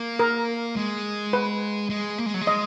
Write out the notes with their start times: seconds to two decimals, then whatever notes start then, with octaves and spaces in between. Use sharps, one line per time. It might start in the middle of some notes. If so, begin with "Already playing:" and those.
Already playing: A#3
0.19 A#4
0.76 G#3
1.33 B4
1.89 G#3
2.18 A#3
2.26 G#3
2.34 F#3
2.41 G#3
2.47 D#5